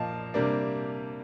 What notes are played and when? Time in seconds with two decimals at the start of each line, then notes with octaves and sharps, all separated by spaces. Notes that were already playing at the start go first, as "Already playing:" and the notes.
Already playing: A#2 F3 A#3 D#5 F5 A5
0.34 C3 G3 A#3 D4